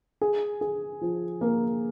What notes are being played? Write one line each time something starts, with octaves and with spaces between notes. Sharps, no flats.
G#4
G#4
F3
A#3